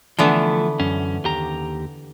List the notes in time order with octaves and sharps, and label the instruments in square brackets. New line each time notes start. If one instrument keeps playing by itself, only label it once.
[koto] D3 E3 B3 [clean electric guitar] F3 A3
[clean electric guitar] F#2 C#4
D#2 G4 A#5